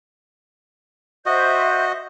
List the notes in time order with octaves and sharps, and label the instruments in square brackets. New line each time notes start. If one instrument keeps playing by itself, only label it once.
[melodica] F#4 D#5 [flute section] C5 E5 G6